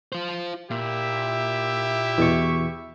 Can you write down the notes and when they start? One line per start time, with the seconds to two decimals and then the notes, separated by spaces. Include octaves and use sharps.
0.12 F4 C5
0.70 A#2 E4 G4 E5
2.18 E2 B2 C#6